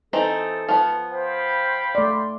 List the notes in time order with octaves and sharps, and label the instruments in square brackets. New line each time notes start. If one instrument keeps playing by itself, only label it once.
[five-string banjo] E3 C4 D#4 [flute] A4
[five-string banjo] F3 B3
[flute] C5 [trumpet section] F5 G5 B5
[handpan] A3 D5 [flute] C6